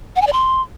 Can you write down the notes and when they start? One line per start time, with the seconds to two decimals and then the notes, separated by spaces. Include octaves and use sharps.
0.16 F#5
0.21 G#5
0.27 D5
0.32 C6